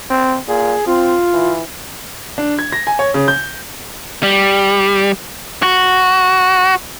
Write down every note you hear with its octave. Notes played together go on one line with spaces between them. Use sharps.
C4
A#2 G#4
C4 F4
E3
D4
G#6
A#6
G#5
C#5
C#3
G6
G3
F#4